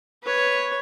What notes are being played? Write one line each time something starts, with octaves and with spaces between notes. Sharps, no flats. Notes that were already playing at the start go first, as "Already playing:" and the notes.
B4 C#5